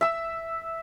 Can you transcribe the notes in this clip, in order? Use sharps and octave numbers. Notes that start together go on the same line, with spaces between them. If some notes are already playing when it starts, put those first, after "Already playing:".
E5 E6